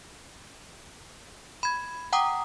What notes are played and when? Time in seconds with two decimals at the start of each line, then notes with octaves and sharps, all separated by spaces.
1.63 B5 G#6
2.13 F#5 G5 A#5 D6 D#6